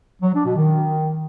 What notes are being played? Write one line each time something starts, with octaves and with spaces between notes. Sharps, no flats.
F#3
D4
B2
D#3